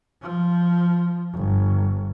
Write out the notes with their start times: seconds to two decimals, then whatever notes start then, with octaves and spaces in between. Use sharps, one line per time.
0.22 F3
1.34 G1